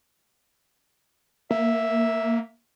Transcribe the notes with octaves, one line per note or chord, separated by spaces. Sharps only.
A#3 E5